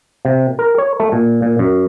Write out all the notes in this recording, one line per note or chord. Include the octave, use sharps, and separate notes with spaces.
C3
A#4
C#5
A3
A#2
A#2
F#2